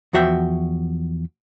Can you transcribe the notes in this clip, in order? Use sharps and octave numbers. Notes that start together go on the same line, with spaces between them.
E2 F3 F#4 E5 G5